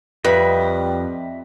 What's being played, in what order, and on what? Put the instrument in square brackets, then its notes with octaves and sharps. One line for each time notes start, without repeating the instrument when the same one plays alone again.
[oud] F2 [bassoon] G3 [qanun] B4 [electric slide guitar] D#5 E5